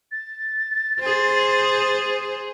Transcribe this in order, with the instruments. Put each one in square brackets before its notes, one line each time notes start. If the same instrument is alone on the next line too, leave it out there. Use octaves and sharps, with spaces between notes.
[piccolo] A6
[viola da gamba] G#4 C5